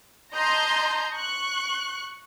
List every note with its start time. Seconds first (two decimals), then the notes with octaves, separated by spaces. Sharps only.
0.37 D#5 A5 A#5 C6 G6
1.16 C#6 F#6